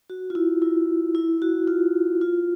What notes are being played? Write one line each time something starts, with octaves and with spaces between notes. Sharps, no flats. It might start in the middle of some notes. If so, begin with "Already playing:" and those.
F#4
F4
E4
E4
E4
F#4
F4
F4